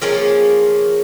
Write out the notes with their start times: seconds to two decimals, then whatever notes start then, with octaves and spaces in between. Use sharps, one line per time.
0.02 F3 A#3 C#4 G#4